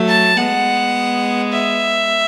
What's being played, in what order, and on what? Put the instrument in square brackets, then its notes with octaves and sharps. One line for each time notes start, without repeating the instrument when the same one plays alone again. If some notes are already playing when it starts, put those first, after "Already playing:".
Already playing: [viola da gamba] F#3 A3
[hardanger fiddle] A5
[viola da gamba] G#3 B3 [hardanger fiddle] F#5
[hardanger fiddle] E5